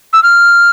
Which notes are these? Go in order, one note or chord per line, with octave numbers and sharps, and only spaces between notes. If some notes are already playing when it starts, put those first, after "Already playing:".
E6
F6